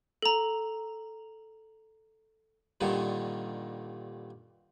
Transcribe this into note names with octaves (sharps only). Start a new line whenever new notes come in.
A4 A#5
G2 A#2 D3 D#3